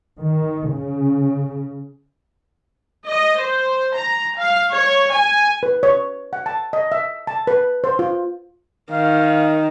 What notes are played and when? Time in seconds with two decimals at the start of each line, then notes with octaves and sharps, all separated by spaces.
0.20 D#3
0.72 C#3
3.07 D#5
3.40 C5
3.97 A#5
4.38 F5
4.71 C#5
5.12 G#5
5.63 B4
5.83 C#5
6.33 F#5
6.46 A5
6.73 D#5
6.92 E5
7.27 A5
7.47 B4
7.84 C5
7.99 F4
8.92 D#3 F5